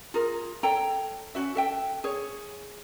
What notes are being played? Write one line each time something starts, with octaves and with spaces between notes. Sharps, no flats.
F4 G#4 A#4
A4 C#5 G5 A#5
C#4 D4 F#4 E5
A4 E5 G5
G#4 C#5